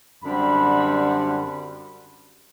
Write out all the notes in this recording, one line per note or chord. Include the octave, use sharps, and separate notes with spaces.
F#2 D3 G3 C4 B5
B5